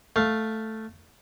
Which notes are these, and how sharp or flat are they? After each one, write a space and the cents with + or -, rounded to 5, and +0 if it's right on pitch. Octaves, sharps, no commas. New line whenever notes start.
A3 +0 F5 +5